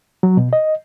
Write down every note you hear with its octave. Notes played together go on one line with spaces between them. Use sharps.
F#3
B2
D#5